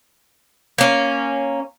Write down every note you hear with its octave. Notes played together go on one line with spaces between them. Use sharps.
A#3 C#4